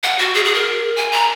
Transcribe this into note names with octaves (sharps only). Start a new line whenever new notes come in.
F#5
F#4
G#4
G#4
A#4
G#5
A#5